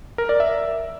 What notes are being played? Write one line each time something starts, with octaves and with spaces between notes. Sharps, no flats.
A#4
D5
E5